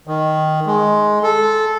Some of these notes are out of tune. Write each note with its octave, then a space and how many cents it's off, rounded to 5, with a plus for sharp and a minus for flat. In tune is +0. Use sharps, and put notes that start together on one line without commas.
D#3 +0
G#3 +10
A4 -15